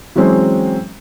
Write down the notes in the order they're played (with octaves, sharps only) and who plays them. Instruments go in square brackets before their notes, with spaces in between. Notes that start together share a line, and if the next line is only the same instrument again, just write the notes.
[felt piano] E3 F#3 G#3 C4 C#4